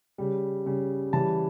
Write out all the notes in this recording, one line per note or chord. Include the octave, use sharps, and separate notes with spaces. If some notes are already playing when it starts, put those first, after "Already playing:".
C#3 G3
C#3 G3
C#3 E3 G3 A5